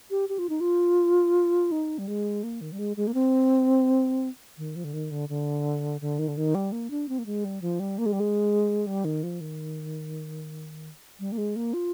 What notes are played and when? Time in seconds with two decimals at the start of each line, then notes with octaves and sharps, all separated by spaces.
0.10 G4
0.29 G4
0.39 F4
0.49 D#4
0.61 F4
1.72 D#4
1.99 G3
2.08 G#3
2.43 A#3
2.61 D#3
2.72 G3
2.79 G#3
2.97 G#3
3.07 A#3
3.14 C4
4.58 D#3
4.76 F3
4.84 D3
4.93 D#3
5.11 D3
5.29 D3
6.01 D3
6.19 D#3
6.28 D3
6.37 D#3
6.55 G3
6.72 A#3
6.90 D4
7.09 C4
7.19 A#3
7.26 G#3
7.45 G3
7.62 F3
7.80 G3
7.98 A#3
8.06 G#3
8.13 G3
8.20 G#3
8.87 G3
9.05 D#3
9.23 F3
9.41 D#3
11.20 G3
11.32 A#3
11.38 G#3
11.56 A#3
11.74 F4